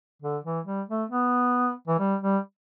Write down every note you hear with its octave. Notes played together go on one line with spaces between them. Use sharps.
D3
E3
G3
A3
B3
E3
G3
G3